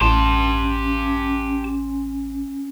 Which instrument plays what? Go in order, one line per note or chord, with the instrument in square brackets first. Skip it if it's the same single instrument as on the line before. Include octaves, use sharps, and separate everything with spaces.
[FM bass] A1 [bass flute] C#4 [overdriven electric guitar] G4 A5 [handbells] C6